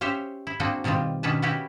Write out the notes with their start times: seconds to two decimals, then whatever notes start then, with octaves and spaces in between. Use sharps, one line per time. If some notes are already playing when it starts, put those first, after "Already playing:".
0.01 C#4 G4 C5 C#5 E5
0.47 E4
0.60 A#3 C4 D4 F#4 G#4 A4
0.84 B2 D#3 G3 C4 F4
1.23 B2 D#3 C#4 D4 B4 A5
1.42 B3 C#4 E4 F#4 G4 B4